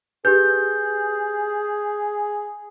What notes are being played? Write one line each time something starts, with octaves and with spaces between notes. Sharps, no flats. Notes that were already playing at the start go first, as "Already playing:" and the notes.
G4 G#4 B4 G6